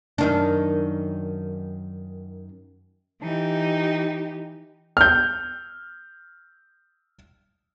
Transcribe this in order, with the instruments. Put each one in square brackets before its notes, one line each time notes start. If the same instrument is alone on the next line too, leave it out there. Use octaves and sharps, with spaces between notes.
[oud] F#2 D#3 D4
[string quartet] E3 D#4 G4
[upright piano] F6 G6